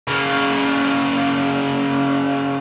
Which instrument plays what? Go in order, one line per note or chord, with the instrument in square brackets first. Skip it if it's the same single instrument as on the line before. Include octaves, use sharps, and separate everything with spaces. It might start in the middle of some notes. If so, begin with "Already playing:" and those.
[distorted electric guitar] C#3 A#3